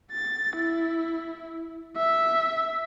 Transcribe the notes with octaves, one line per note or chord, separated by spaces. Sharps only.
A6
E4
E5